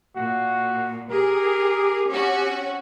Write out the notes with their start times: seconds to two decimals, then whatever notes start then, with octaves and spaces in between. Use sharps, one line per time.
0.17 A#2 F#4
1.11 G4 G#4 A#4
2.10 C4 C#4 F#4